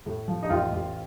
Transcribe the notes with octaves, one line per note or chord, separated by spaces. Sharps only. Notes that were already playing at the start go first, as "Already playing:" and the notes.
A2
F3
D#4
A1 F4
A1